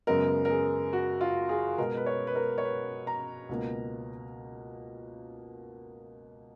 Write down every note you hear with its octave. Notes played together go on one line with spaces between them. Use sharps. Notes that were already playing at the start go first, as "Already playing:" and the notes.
F#2 C#3 G#3 B3 A#4
A#4
G#4
F#4
F4
G#4
B2 G#3 B3 A#4
B4
C#5
B4
A#4
C#5
B4
A#5
C#2 B2 A#3